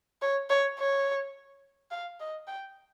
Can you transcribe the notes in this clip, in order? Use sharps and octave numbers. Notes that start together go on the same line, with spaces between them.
C#5
C#5
C#5
F5
D#5
G5